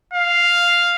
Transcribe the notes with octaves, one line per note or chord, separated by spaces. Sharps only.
F5